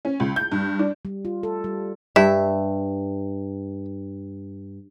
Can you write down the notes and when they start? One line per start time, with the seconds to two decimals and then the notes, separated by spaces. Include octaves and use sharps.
0.05 C#4
0.20 C#2
0.36 G6
0.52 G2
0.79 D4
1.05 G3
1.25 F4
1.43 A4
1.64 G3
2.16 G2 E5